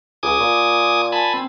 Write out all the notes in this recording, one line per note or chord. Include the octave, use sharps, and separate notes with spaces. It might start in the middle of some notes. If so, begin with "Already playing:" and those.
C#2 G#5 D6 D#6
A#2
G#5 A5 B5
C4